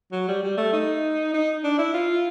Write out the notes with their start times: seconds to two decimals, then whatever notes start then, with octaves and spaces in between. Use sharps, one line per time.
0.12 F#3
0.28 G3
0.43 G3
0.57 A3
0.73 D#4
1.34 D#4
1.64 D4
1.78 E4
1.94 F4